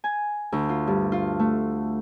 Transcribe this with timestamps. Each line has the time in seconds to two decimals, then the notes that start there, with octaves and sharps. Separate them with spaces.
0.04 G#5
0.52 D2
0.69 F4
0.87 G2
1.12 F4
1.39 A3